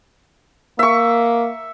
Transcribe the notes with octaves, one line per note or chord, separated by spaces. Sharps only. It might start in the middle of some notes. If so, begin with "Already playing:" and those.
A#3 E5 C#6